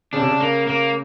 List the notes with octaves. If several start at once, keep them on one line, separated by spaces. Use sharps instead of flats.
C#3 D4
C3
C#3
A#3
A#3